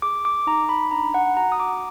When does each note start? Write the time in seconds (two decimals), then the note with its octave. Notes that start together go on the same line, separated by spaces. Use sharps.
0.02 G#4 D6
0.25 D6
0.47 D#4 A#5
0.69 B5
0.91 D4 A#5
1.14 F#5
1.37 F#4 A#5
1.52 D#6
1.60 D6